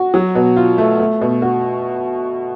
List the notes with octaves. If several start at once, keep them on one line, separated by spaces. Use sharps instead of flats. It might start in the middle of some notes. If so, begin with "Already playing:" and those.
Already playing: F#4
F#3
B2
F4
A3
A3
B2
F#4